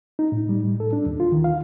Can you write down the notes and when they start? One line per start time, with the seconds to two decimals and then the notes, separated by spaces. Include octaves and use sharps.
0.19 D#4
0.32 A2
0.49 G3
0.64 A2
0.80 A4
0.93 D4
1.06 D#2
1.20 F4
1.32 D#3
1.44 F5